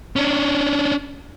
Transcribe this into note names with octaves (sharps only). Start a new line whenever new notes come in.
C#4 D4